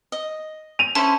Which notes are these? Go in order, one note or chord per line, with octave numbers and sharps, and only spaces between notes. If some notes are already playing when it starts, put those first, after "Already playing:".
D#5
D#7 F7
C#4 E4 A4 C5 A5